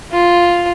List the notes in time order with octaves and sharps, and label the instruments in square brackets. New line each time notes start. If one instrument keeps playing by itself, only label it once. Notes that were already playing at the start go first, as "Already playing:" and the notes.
[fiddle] F4